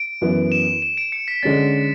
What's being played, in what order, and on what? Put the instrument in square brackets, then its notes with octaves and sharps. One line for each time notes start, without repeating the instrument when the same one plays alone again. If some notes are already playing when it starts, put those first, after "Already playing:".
Already playing: [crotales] D7
[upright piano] F#2 E3 B3
[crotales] E7
E7
D7
C#7
B6
[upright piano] D3 G#3 C#4 [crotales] A6